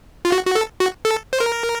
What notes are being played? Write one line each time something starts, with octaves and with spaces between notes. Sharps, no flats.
F4
F#4
F#4
A4
F#4
A4
C5
A#4